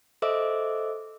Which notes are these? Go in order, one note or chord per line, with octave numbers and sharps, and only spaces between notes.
A4 C5 D#5 E5 D6 E6